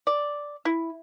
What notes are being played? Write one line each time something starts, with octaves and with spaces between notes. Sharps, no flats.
D5
E4